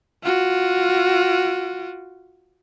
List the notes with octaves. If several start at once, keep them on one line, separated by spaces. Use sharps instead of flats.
F4 F#4